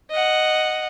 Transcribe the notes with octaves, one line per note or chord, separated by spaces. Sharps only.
D#5 F#5